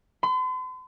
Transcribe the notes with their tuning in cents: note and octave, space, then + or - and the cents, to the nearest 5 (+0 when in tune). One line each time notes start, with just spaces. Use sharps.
C6 -45